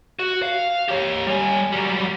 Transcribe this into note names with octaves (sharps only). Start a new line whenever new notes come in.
F#4
F5
G4 C#5
G3 G#5
F#3 G3